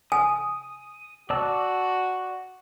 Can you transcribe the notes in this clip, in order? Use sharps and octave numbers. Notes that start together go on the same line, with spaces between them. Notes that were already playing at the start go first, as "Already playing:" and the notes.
G#5 D#6
F#4 D5 A5 E6